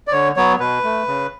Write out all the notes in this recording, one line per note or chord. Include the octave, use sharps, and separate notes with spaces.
D5
D3 C#5
F#3 B3 C#5
B2 B4
A3
C#3